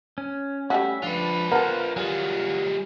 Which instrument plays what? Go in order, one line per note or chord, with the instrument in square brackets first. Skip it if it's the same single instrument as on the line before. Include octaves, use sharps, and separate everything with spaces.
[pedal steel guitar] C#4
[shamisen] G3 A3 F#4 [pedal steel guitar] C#4 E5
[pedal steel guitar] F3 D4 [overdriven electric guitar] F4 B4
[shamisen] B3 A4 [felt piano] A#4 [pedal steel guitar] C5 F5 F#5
[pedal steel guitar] F#3 F4 [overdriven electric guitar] G3 G#4